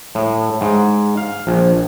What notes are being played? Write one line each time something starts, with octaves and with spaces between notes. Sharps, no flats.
A2
G#2
F5
A#1